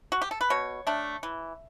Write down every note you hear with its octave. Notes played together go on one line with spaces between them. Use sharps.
F#4
G4
A4
B4
B2 C#5
A3 D4
E3